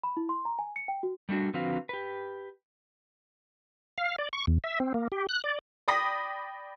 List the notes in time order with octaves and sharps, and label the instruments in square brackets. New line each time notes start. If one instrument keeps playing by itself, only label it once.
[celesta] B5
E4
C6
A#5
G#5
C#7
G5
F#4
[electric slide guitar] G3 A3 D4 F#4
D3 F3 C4 F#4 B4 F5
G4 B4
[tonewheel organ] F5
D5
C#6
E2
E5
C4
A#3
G4
F#6
D5
[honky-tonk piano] D5 G5 B5 D#6 A#6 B6